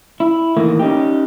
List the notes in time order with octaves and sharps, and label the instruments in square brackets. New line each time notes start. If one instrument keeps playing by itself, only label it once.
[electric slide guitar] E4
A2 D#3 E3 A#3
C#4 D#4 G4